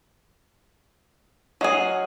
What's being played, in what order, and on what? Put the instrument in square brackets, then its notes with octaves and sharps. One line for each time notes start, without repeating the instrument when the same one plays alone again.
[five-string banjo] F#3 G#4 [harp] D#5 F5 F#5